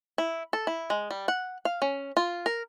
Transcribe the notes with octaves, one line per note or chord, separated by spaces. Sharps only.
E4
A4
E4
G#3
G3
F#5
F5
C#4
F4
A#4